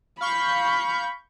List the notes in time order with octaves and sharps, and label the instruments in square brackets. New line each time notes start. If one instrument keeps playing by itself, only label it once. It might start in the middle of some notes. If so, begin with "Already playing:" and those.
[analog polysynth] F5 C#6 G6 [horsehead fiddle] B5